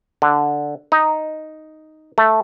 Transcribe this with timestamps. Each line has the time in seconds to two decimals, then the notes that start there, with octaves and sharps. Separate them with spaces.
0.22 D3
0.92 D#4
2.18 A3